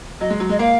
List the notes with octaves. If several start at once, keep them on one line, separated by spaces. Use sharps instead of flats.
F#3 D#5
G#3
F#3
G#3 D#5
A#3 F5